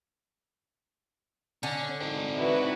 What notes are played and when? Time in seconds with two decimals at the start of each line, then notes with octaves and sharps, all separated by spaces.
1.63 D3 C#4
2.00 C4 D#4
2.37 E4 F#4 B4